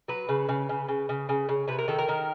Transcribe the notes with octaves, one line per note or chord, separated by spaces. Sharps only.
F#3 B4
C#3
C#3
C#3
C#3
C#3
C#3
C#3
C3 B4
A#4
D#3 A4
A#4
D#3